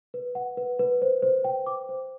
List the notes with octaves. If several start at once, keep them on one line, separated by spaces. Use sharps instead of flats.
B4
F#5
B4
B4
C5
C5
G5
D6
C5